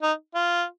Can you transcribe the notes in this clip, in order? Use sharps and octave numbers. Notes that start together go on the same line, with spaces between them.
D#4
F4